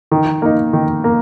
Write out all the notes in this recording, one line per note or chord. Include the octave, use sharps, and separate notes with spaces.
D#3
A#3 D#4
D#3
A#3